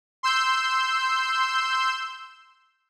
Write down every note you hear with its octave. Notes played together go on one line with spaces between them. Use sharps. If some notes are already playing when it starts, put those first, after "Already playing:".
C6 E6 G6